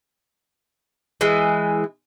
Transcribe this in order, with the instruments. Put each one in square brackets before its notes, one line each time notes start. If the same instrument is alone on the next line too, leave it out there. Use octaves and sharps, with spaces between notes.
[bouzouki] E3 G#3